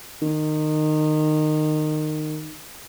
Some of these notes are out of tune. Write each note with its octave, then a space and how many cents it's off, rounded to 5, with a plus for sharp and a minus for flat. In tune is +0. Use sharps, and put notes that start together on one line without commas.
D#3 -20